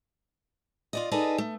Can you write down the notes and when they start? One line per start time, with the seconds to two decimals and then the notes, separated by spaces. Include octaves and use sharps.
0.93 F4 D5 D#5
1.11 D#4 G#4 A4 B4 D5 D#5
1.38 A3